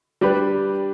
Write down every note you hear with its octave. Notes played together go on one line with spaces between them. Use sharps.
G3 D4 G4 B4